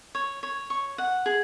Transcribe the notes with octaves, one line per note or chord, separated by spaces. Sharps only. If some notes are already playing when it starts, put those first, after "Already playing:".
C#5
C#5
C#6
F#5
G#4